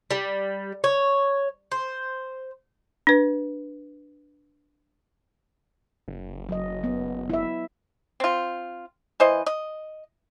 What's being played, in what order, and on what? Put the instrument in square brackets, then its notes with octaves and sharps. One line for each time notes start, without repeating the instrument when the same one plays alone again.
[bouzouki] G3
C#5
C5
[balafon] D4 B4
[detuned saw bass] F#1
[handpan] F#3 D#5
B3
E4 E5
[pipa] C4 F4
E3 C5 D#5
D#5